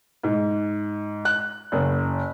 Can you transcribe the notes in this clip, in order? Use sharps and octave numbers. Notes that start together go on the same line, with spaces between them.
G#2
F#6
F#1